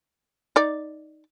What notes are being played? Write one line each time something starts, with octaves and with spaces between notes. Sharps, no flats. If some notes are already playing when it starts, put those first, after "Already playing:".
D#4 D5